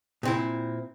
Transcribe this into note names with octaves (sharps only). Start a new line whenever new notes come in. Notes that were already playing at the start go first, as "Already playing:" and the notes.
A#2 C4 E4